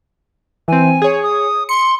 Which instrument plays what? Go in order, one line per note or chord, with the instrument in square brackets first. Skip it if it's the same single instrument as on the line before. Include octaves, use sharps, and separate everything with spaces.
[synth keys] E3 C4 [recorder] G#5
[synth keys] G#4 C#5
[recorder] D#6
[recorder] C6 [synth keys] C#7